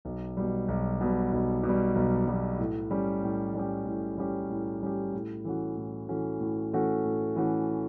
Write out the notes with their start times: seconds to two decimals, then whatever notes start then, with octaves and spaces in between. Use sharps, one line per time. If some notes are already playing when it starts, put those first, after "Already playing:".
0.05 B1
0.37 B2 G3
0.68 B1
1.01 B2 G3
1.32 B1
1.63 B2
1.69 G3
1.95 B1
2.27 B2 G3
2.59 A2
2.91 G3 C#4 G4
3.23 A2
3.54 G3 C#4 G4
3.86 A2
4.18 G3 C#4 G4
4.50 A2
4.82 G3 C#4 G4
5.14 A2
5.45 E3 A3 C#4 F#4
5.76 A2
6.08 E3 A3 C#4 F#4
6.40 A2
6.73 E3 A3 C#4 F#4
7.05 A2
7.36 E3 A3 C#4 F#4